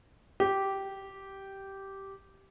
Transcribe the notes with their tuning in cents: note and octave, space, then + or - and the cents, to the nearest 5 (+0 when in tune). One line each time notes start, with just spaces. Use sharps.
G4 -10